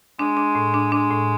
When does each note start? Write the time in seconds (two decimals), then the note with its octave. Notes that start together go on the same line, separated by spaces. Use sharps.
0.19 G#3 D4
0.37 D4
0.55 A2
0.74 D4
0.92 G#3 D4
1.11 A2